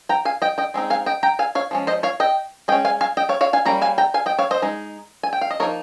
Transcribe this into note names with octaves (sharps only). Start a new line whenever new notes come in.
G5 A#5
F5 G#5
D#5 G5
D#5 G5
G#3 C4 D#4
F5 G#5
D#5 G5
G5 A#5
F5 G#5
C#5 F5
F3 G#3 C#4
C5 D#5
C#5 F5
D#5 G5
G#3 C#4 D#5 G5
F5 G#5
F5 G#5
D#5 G5
C#5 F5
C#5 F5
F5 G#5
G3 A#3 C#4 A#5
F5 G#5
G5 A#5
F5 G#5
D#5 G5
C#5 F5
C5 D#5
G#3 D#4
G#5
G5
F5
D#5
F3 A#3 D#4 A#4 C#5